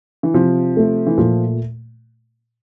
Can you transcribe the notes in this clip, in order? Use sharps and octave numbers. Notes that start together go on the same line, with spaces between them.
E3
C3 F3
A3
E3
A#2 F3